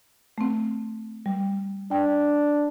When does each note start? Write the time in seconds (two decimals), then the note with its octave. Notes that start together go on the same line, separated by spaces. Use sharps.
0.38 A3 C4
1.26 G3
1.91 D4 G5